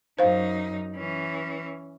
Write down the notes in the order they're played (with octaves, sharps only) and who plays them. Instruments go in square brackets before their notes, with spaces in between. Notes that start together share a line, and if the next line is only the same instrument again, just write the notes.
[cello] F#2 D#4 [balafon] C5 F5
[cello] E3 C#4